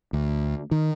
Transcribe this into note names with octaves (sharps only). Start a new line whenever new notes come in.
D2
D#3